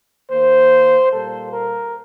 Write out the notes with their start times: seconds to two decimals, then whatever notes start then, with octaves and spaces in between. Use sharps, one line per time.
0.30 D#3 A#3 C5
1.12 A#2 G3 A#3 A4
1.53 A#4